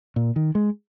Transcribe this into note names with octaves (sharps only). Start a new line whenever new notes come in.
A#2
D#3
G#3